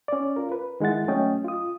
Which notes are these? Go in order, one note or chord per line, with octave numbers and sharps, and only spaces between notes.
C#4 D5
F4 A#4
B4
D#3 G#3 E4 F#5 A6
F#3 A3 C#4 D#5 G5
F4 D#6